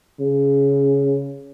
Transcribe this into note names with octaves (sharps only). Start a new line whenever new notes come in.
C#3